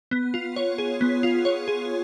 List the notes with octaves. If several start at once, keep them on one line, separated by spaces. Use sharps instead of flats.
B3
F4
C#5
G#4
B3
F4
C#5
G#4